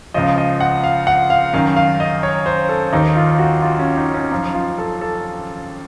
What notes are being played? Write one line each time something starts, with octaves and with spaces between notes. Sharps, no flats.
C#2 C#3 F3 D#5
D#5
F#5
F5
F#5
F5
F#2 D#3 F5
F5
D#5
C#5
C5
A4
D#2 D#3 D#4
F4
F#4
F4
C#4
D#4
C#4
F#2 F3 D#4
F4
A4
A4